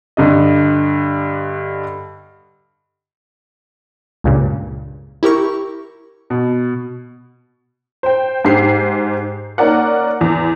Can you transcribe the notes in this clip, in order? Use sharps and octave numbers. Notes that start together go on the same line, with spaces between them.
G2 D3 D#5
C#2 G2 A#2 C#3
E4 G4 A#4 C#6
B2
C5 G5
G#2 G4 C5 C7
A#3 C#4 D#4 A#4 D5 F#5
E2